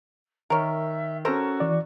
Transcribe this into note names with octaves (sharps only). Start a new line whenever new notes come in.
D#3 A#4 C#5 E5
C#4 F#4 A4 A#4 C5 A#5
E3 D5